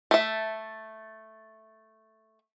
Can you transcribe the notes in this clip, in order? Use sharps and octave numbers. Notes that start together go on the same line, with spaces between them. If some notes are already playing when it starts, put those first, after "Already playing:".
A3 E5